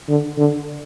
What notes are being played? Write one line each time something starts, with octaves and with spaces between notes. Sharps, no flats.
D3
D3